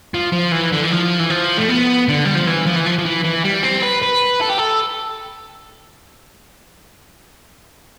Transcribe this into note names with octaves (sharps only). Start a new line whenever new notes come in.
F3
F3
E3
D3
E3
F3
E3
F3
A3
B3
D3
G3
F3
E3
F3
E3
F3
F3
E3
E3
G3
C4
B4
B4
A4
G4
A4